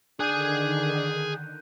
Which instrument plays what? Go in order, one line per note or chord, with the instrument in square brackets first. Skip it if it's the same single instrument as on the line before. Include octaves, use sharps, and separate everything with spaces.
[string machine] D3 D#3 [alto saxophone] D4 [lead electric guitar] G#4 G#5 [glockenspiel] F#6 G6 D#7